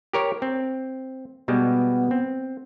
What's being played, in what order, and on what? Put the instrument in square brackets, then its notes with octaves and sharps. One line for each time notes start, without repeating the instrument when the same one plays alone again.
[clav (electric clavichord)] G4 A#4 C#5
C4
[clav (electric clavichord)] B2 G3 G#3 [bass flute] B3
[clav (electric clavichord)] C4